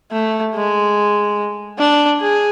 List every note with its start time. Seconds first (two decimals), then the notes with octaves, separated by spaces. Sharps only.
0.12 A3
0.55 G#3
1.79 D4
2.21 G#4